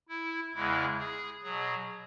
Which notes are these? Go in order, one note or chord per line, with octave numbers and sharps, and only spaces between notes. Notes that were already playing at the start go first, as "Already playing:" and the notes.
E4
E2 C#3 G#3 E4
G#4
B2 F#3 G#4